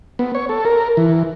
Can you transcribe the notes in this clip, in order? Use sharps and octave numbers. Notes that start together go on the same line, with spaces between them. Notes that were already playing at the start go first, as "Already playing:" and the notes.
B3
C#5
A4
A#4
E3